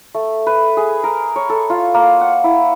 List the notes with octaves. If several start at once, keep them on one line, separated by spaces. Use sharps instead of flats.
A3
B4
G#4
A#4
C#5
A4
F4
A#3
F#5
E4